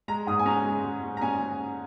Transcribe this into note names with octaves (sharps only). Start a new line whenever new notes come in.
G#3 A#5
G#2 D#6
G#5
C#4 A#5
G#3
G#3
C#4
A#5
C#4 G#5